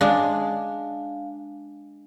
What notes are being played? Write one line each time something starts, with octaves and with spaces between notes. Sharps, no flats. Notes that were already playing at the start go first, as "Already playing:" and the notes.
G#3 D4 F5